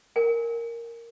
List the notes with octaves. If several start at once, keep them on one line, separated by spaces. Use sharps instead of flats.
A#4 G#5